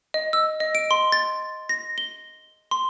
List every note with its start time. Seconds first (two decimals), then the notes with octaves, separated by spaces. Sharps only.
0.14 D#5
0.33 E6
0.60 D#5
0.75 D7
0.91 C6
1.12 A6
1.69 A#6
1.98 G7
2.71 C6